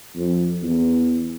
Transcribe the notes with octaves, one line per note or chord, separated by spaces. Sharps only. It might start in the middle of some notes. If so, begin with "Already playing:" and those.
F2
E2